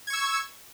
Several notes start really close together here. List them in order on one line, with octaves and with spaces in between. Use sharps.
G#6 C#6 E6